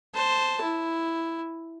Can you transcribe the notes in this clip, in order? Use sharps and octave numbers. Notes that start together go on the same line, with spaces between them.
C5 A5
E4